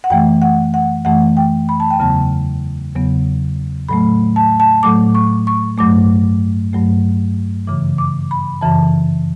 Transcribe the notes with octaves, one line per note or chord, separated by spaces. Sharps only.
F#5
F#2 E3 A3 G5
F#5
F#5
F#2 E3 A3 F#5
G5
B5
A5
G5
E2 C#3 F#3 B3 A5
E2 C#3 F#3 B3
A2 F#3 A3 B5
A5
A5
A2 F#3 A3 D6
C#6
C#6
G2 F#3 A3 D6
G2 F#3 A3
F#2 C#3 E3 D6
D6
B5
F#2 C#3 E3 A5